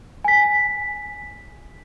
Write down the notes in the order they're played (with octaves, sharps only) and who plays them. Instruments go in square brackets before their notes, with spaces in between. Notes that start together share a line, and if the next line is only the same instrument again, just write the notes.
[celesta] G#5 B6